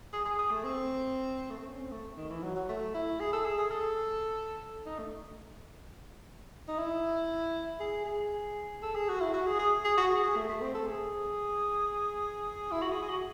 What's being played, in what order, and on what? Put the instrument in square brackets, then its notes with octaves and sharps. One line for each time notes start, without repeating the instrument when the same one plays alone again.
[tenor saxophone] G#4
G#4
G#4
A3
C4
A3
C4
C#4
C4
A3
D#3
E3
F#3
F#3
A3
E4
G#4
A4
G#4
G#4
A4
D#4
A3
D#4
E4
G#4
G#4
A4
G#4
F#4
E4
F#4
G#4
G#4
G#4
F#4
G#4
G#4
A3
A3
C4
A4
G#4
E4
F#4
G#4
G#4
F#4